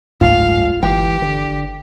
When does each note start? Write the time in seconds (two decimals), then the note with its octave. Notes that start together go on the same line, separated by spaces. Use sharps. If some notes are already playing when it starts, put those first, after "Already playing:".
0.21 F#1 C#2 G#2 A3 F4 F5
0.83 G1 E3 G4 G5
1.22 D3